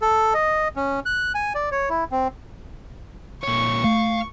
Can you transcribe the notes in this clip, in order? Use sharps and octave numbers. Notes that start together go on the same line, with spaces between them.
A4
D#5
C#4
F#6
G#5
D5
C#5
E4
C4
A#2 C#5 C#6
A3 F5